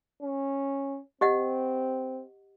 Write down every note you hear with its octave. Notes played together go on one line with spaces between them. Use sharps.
C#4
C4 G4 D#5 F#5